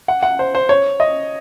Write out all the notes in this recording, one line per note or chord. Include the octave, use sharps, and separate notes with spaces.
F#5
F#5
C5
C5
C#5
D#5